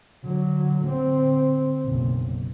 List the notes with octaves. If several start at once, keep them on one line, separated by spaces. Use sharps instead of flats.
D3 F#3
D3 C4
F#1 B1